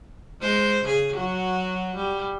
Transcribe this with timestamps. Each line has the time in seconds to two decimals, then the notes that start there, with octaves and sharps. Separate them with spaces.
0.41 G#3 C5
0.84 C#3 G#4
1.14 F#3 F#4
1.97 G3